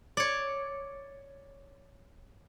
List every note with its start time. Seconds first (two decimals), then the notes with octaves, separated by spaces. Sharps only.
0.17 C#5 D5